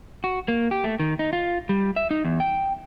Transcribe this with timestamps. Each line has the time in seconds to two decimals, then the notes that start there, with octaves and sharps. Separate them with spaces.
0.24 F#4
0.48 A#3
0.71 G4
0.84 A3
1.00 D#3
1.19 D#4
1.33 F4
1.69 G3
1.96 E5
2.11 D#4
2.25 E2
2.40 G5